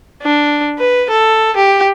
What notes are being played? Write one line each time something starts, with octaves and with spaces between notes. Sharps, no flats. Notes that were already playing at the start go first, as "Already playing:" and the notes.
D4
B4
A4
G4